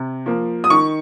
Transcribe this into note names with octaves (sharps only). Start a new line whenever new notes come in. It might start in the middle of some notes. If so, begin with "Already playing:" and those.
Already playing: C3
F3 A#3
D#6
D#3 C#6